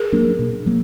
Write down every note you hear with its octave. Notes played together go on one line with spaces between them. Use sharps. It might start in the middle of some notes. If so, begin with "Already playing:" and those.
Already playing: G#4 A#4
F#3 A#3 D4
B2
F#3 A#3